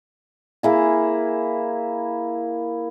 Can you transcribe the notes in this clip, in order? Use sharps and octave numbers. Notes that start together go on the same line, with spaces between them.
A#3 E4 G#4